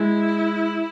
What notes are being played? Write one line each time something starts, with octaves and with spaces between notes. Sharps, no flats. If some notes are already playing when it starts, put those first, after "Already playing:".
Already playing: G#3 E4